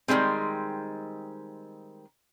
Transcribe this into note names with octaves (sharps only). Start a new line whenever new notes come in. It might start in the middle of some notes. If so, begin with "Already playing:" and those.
D#3 E3 G3 G#3 C4